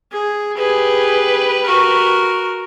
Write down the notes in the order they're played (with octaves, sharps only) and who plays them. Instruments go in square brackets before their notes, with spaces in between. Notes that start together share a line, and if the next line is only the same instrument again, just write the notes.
[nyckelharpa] G#4
[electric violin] G4 B4 [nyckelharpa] G#4
[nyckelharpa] F#4 A#4